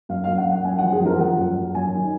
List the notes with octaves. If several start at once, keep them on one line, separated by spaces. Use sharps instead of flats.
F#2 F5
F5
F#2
F#5
F#2
F#5
F#2 G#5
F#5
F3
G#4
F3 A#4
F3 F#5
F#2
F#2
F#2 G#5
D#3